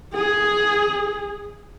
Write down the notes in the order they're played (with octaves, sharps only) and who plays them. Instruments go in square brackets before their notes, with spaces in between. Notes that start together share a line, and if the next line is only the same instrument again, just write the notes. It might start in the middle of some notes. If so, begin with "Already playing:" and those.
[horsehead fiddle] G#4